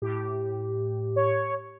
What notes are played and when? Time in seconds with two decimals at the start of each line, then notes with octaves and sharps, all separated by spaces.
0.02 A2 G4
1.16 C#5